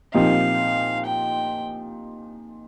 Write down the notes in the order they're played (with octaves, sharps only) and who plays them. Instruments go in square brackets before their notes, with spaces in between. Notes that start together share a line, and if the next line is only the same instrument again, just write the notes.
[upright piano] A#2 F3 C4 D#4 G4 [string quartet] F5
[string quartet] G5